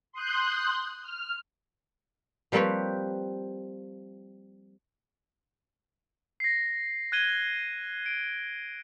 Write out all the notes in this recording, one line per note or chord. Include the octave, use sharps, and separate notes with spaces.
C6 D#6 F#6 G6
F6
F3 G3 A#3 C4 B4 C#5
A#6 C7
F#6 G#6 D#7 G7
D7